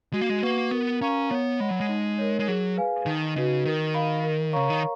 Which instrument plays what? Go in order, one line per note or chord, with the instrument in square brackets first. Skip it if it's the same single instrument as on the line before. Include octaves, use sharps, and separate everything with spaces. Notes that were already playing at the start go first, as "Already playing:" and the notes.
[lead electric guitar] G#3 [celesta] F#4
[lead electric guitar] A#3
G#3
[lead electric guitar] A#3 [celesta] B4 F#5 C#6
[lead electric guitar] B3 [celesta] A#4
[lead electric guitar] C#4 [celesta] F5 A#5 C#6
[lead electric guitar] B3 [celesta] C#5
[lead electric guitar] G#3 [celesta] F#5 B5
[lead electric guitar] F#3
G#3
[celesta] D#4
A#4 C#5
[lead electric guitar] G#3
[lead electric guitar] F#3 [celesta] G#4
[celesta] B4 F5 G#5
[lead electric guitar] D#3 [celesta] D#4
[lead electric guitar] C#3 [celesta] F#4 B4 D#5
[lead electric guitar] D#3 [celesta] A#4
[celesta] F5 B5
A#4
[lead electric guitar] C#3 [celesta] C#5 F5 A#5 C#6
[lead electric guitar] D#3